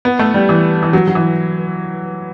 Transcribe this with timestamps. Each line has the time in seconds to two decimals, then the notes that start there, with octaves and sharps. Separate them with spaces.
0.05 B3
0.19 A3
0.34 G3
0.49 E3
0.83 E3
0.93 F#3
1.08 F#3
1.15 E3